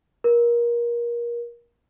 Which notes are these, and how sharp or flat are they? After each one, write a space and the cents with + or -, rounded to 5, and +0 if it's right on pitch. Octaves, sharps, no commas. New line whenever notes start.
A#4 +25